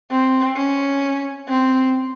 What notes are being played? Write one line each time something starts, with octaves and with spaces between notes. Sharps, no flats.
C4
C#4
C4